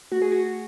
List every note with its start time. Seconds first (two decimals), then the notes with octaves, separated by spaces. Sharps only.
0.12 A3 F#4
0.22 G#4
0.32 F#4